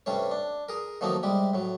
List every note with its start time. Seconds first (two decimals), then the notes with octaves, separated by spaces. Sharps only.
0.06 G2 C3 G3 A3 C#4 C#5
0.31 D4
0.69 G#4 A#4
1.01 D#3 F3 F#3 A3 A#3 D#4
1.23 C3 G3 G#3 G4
1.54 A2 F#3